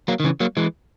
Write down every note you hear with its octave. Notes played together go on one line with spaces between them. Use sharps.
F#3 A#3
D#3
C#3 E3
F#3 A#3
E3 G#3